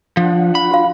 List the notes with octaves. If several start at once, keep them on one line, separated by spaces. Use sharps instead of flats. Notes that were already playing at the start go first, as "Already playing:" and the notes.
F3 D4 F4 F#5
B5
F#4 F5